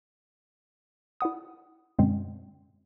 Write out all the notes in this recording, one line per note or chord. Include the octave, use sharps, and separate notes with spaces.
E4 D5 F#5 D#6
F#2 B2 D3 G#3 C4 C#4